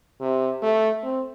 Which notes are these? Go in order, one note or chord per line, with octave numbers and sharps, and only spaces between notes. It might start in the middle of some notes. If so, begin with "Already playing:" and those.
C3
A3
C4